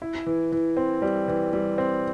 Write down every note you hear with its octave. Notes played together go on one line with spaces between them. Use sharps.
E4
E3
E3
C4
G3
E3
G3
C4